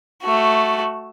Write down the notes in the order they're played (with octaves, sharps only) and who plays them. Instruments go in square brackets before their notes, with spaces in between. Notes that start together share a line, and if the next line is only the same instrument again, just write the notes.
[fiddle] A3 F#4